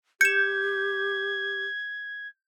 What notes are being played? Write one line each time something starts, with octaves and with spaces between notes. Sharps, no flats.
G4 G6 G#6 C#7 E7